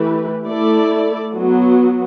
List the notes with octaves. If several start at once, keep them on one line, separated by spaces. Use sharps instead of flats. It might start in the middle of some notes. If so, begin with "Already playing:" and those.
Already playing: E3 A3 E4 G4 B4
A3 E4 A4 D5
F#3 B3 F#4